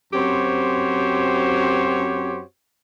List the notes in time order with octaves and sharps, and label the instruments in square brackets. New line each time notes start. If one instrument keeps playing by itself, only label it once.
[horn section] F#2 C4 F#4 G4 C5 C#5